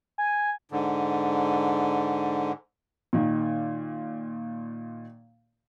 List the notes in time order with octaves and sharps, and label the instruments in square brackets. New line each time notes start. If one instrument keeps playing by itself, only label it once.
[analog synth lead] G#5
[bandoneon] G#2 D3
[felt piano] A#2 D#3